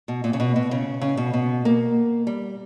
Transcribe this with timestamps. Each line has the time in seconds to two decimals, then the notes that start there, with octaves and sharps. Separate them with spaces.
0.08 B2
0.24 A#2
0.33 C#3
0.40 B2
0.56 B2
0.71 C#3
1.01 C#3
1.17 B2
1.33 B2
1.65 A#3
2.27 G3